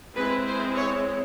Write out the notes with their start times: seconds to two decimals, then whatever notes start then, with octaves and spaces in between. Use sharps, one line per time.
0.17 G#3 C4 E4 B4
0.47 C5
0.76 C#5